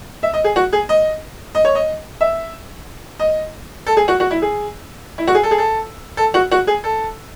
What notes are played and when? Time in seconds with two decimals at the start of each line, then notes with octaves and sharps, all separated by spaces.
0.23 E5
0.33 D#5
0.44 G#4
0.56 F#4
0.73 G#4
0.89 D#5
1.55 D#5
1.65 C#5
1.75 D#5
2.21 E5
3.20 D#5
3.87 A4
3.97 G#4
4.08 F#4
4.20 F#4
4.31 E4
4.42 G#4
5.18 E4
5.27 F#4
5.35 G#4
5.43 A4
5.51 G#4
5.58 A4
6.17 A4
6.34 F#4
6.51 F#4
6.67 G#4
6.84 A4